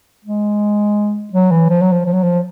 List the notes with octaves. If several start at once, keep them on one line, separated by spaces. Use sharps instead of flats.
G#3
F#3
E3
F3
F#3
F3
F3
F#3
F3